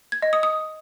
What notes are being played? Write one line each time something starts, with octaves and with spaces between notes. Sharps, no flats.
G#6
D#5
D#6
D#6